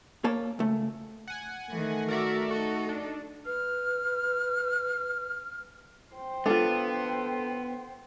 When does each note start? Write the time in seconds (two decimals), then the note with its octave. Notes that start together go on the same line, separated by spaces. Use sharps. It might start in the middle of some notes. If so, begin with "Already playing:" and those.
0.24 A#3 C#5 A5
0.59 C#2 A3
1.27 F#5 G#5
1.70 D#3 E3 A3
2.08 F#4 A#4 D5 E5
2.51 D#4 F#4 A4
2.89 D4
3.46 B4 F6
6.15 C5 G5
6.46 B3 D4 F4 A4